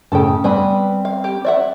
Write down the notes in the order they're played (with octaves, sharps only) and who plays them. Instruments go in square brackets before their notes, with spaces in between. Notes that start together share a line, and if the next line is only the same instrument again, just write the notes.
[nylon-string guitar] A2 C#3 A5 [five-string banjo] A4 G5
[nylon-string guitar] G3 C4 [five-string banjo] B3 G#5 B5
[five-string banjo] F5
G4
D5 E5 F#5